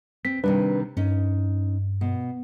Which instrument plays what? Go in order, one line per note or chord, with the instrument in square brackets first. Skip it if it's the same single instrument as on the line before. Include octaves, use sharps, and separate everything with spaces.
[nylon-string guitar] C4 [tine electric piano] B6
[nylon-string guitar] C3 D#3 G3 [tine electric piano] D4 B4
[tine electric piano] G2 [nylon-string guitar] C#4 D#4
[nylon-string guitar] B2